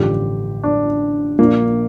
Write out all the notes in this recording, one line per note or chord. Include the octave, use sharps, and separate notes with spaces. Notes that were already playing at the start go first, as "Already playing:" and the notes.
Already playing: A1 G2 D3 F3 G4
D4
A#1 A#2 F3 A#3